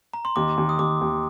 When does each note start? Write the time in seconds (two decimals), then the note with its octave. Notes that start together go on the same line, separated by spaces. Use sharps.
0.14 A#5
0.25 C6
0.36 D#2 D6
0.58 D#2
0.69 D#6
0.79 D#2 D6
1.01 D#2